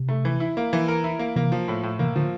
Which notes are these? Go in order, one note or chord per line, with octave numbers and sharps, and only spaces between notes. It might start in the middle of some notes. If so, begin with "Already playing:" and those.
Already playing: C3
A3
E3
E4
A#3
E3
A#4
E4
A#3
C3 E3 A#3
F3
A2
A2
C3 E3 A#3
D3 F3